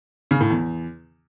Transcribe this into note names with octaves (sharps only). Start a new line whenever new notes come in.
C#3
A2
E2